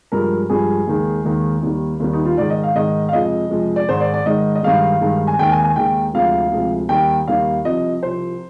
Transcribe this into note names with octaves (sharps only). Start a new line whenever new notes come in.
G2 F3 G#3 A#4
G2 F3 G#3 G#4
D#2 D#3 G#3
D#2 D#3 G#3
D#2 D#3 G3
D#2 D#3 G3
D#4
F4
G#2 D#3 G#3 D5
D#5
F5
G#2 D#3 G#3 D#5
F5
F2 C3 F3 G#3 D#5
F2 C3 F3 G#3
D5
G#2 D#3 G#3 C5
D5
D5
G#2 D#3 G#3 D#5
D#5
G2 D#3 G#3 F5
G2 D#3 G#3
G#5
D#2 D#3 G#3 G5
G#5
G#5
D#2 D#3 G#3 G5
D2 C3 F3 G#3 F5
D2 C3 F3 G#3
D#2 D#3 G3 G5
D#2 D#3 G3 F5
C2 C3 F3 D#5
C2 C3 F3 C5